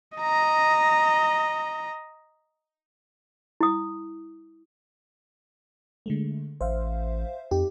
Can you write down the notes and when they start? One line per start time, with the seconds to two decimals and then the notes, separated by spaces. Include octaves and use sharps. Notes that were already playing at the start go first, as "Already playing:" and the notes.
0.17 D#5 A#5
3.61 E4 D#6
6.06 D3 G#3 A3
6.61 A1 C5 E5 F5
7.51 F2 D#4 G4